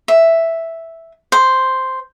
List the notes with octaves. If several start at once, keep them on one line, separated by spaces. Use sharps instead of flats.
E5
C5